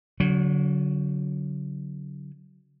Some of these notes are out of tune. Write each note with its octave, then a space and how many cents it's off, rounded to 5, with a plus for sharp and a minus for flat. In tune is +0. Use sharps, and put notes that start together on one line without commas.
D3 -40 F#3 +0